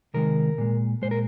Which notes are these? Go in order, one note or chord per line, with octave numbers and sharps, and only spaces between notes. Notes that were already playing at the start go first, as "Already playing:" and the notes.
C3 D#3 G#3 A#4
A#2 G#3
A#2 G#3 C5
A#4